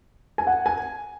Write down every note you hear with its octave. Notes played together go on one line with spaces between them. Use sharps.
G#5
F#5
G#5